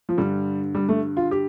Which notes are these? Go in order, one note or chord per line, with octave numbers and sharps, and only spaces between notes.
F3
G2 D3 G3
G3
A3
F4
G4